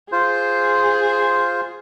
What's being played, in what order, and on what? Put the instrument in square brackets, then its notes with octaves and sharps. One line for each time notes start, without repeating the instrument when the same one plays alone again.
[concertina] F4 C5 [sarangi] G#4